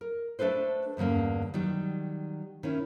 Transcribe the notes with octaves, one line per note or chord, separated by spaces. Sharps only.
A#4
A3 D4 A4 B4 C5
E2 G2 D3 A#3 C#4
D#3 F#3 G3
D#3 C#4 E4